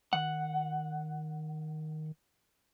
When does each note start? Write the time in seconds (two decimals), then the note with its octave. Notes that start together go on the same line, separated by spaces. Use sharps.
0.13 D#3 F#5